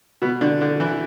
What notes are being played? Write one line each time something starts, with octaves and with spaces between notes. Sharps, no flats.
B2 B3
D3 D4
D3 D4
E3 E4